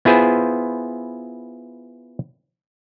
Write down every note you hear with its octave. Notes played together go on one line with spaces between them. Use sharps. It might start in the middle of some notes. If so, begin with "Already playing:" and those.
B3 E4 F4 G#4 B4 C5